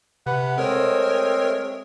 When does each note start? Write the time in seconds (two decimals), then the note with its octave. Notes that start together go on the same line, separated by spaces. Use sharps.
0.26 C3 B4 F#5
0.58 G#3 A3 C4 A#4 C#5 G5